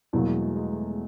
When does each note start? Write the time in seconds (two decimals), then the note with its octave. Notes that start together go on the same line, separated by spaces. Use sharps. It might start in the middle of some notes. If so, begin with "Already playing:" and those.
0.13 E2 B2 F#3 G3 A#3
0.27 G#3
0.42 A3
0.56 G#3
0.72 A3